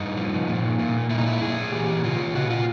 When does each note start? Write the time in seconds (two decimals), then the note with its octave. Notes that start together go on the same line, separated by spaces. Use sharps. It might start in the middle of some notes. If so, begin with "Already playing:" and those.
Already playing: G2 D#4
0.17 F3
0.48 A#2
0.79 A#2
1.10 A#2 E4
1.18 D#4
1.26 E4
1.41 A#2 G#4
1.72 E3 G4
2.04 C#3 F4
2.35 A#2 F#4
2.50 F4